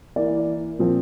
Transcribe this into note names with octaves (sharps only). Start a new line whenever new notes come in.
E3 A#3 D5
A#2 F3 C4